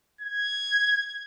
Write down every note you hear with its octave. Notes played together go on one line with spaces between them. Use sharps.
G#6